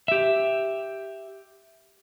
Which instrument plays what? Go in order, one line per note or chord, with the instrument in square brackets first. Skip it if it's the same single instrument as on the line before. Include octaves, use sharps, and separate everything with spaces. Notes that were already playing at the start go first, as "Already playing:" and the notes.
[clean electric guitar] G4 E5